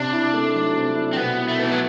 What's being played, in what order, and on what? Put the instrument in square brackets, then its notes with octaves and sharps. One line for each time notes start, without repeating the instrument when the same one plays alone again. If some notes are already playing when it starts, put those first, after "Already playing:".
Already playing: [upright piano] C3 [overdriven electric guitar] D4
[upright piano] E4
A3
F#3
C3
E4
[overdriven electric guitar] C4
[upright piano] B2 [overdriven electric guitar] B3
[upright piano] E4
[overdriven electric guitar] A3
[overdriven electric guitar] E3 [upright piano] B3
[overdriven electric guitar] F#3